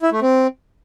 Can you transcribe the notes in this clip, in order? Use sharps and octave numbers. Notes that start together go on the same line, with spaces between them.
E4
A3
C4